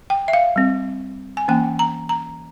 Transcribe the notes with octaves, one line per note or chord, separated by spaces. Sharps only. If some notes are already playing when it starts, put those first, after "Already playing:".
G5
E5
F5
G3 C4
G#5
E3 A#3 C#4 G5
A#5
A#5